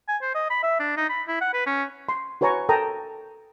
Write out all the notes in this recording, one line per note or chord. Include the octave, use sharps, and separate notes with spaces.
G#5
C5
D#5
B5
E5
D4
D#4
B5
E4
F#5
B4
C#4
C6
F#4 B4 C#5 G#5 A#5 C#6
A4 A#4 G5 A5 A#5 D#6